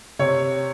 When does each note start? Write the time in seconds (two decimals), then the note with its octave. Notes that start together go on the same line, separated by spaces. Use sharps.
0.19 C3 C#5